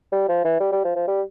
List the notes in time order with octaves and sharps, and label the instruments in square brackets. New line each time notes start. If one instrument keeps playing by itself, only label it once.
[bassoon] G3
F3
E3
G3
G3
F3
F3
G3